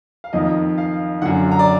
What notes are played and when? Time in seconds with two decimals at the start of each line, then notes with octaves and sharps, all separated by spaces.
0.24 F5
0.33 F2 D#3 D#5
0.78 F5
1.22 F#2 D3 F#5
1.51 A#5
1.59 D5